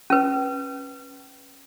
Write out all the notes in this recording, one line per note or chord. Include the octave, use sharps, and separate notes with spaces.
C#4 B4